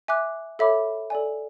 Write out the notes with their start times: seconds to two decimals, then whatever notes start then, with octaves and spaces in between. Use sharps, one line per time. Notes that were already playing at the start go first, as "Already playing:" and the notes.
0.08 E5 G#5 D6 F#6
0.59 A4 C#5 E5 B5 D6
1.10 A4 D5 G#5